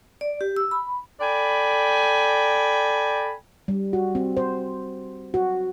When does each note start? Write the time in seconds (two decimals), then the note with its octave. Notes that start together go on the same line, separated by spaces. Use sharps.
0.21 D5
0.41 G4
0.56 E6
0.71 B5
1.21 A4 D5 G5 G#5 B5
3.68 G3
3.93 F#4
4.15 C4
4.37 C5
5.34 F#4